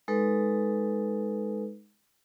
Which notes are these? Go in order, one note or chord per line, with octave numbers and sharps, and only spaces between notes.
G#3 D#4 A4 B4